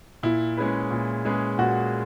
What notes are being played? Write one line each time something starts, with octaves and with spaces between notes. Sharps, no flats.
A#2 E4
G#3 C#4 G#4 B4
A#2
G#3 C#4 G#4 B4
A#2 F#4